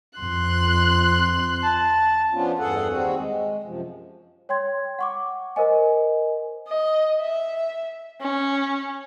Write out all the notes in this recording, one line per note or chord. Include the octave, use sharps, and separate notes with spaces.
F2 C6 F#6
A5
F3 B3 C#4 D4 F4
E2 G2 G#4 A4 F#5
D#2 G3 C4 F#4 G#4
G#3
F#2 C3 F3
C#5 G5 C6 G#6
F#5 C#6 D6
A#4 C5 D#5 G#5
D#5
E5
C#4